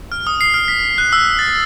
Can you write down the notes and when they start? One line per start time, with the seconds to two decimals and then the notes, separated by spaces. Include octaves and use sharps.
0.12 F6
0.27 D#6
0.41 C7
0.54 F6
0.68 B6
0.98 F#6
1.13 E6
1.39 A6